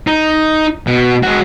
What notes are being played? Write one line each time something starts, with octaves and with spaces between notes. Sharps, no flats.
D#4
B2
G#3 F#4